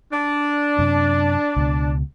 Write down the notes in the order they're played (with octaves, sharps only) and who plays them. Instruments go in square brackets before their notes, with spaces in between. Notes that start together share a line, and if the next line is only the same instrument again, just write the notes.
[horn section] D4
[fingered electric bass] F#2 C3
C#2 B2